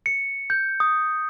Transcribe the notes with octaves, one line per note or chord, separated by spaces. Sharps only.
C#7
G6
D#6